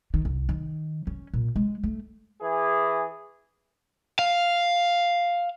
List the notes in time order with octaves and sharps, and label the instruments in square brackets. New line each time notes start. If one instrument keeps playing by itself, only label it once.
[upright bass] D#3
C2
D#3
C#4
A#2
G#3
A3
[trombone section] E3 G#4
[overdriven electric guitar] F5